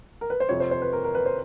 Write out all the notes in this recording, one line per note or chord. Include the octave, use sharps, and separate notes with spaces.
A#4
B4
C5
F2 C3 F3 C#5
C5
C5
B4
A#4
A#4
B4
C5